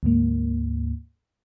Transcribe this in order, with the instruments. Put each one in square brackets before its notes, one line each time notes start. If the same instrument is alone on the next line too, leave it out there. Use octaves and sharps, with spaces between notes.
[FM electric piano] D2 G#2 A#3